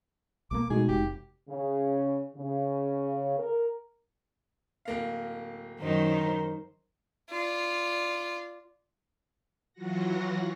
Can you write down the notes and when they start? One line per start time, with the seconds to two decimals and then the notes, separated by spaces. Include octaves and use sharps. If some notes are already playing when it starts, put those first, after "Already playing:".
0.51 B1 A3 A#3 D6
0.70 B2 G#3 A3 D#4 F#4 G#4
0.89 F1 G4
1.49 C#3
2.37 C#3
3.38 A#4
4.85 D1 A#3 F5
5.80 F#2 D#3 D#4 A#4 C5
7.30 F4 D5
9.73 E3 F#3 F4 F#4 F#5 A#6